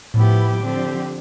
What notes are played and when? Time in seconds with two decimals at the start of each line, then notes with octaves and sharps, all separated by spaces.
0.13 A2 F3 B3 E4 G4
0.60 D3 F3 C4 G4